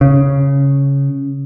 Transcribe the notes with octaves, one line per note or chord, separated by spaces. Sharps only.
C#3